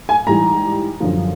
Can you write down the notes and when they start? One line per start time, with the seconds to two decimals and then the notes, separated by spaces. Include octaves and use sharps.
0.09 G#5
0.27 G#2 E3 G3 A#5
1.00 F#2 D3 F3